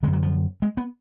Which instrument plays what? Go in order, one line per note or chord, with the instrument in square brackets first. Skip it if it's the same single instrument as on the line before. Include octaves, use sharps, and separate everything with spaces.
[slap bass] D3 G#3
F#2
F#3
F3
G#3
B3